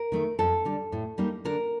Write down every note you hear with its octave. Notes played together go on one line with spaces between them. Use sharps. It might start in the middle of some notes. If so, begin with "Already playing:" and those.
Already playing: A#4
D#3 A3 D#4
F2 A4
D3 G3
A2
G3 A#3 D#4
D3 A#4